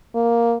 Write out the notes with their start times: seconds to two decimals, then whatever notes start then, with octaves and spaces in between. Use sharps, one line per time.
0.15 A#3